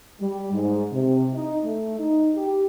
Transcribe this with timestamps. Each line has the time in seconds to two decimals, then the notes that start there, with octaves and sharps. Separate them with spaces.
0.19 G3
0.52 G#2
0.91 C3
1.34 D#4
1.64 A3
1.98 D#4
2.35 G4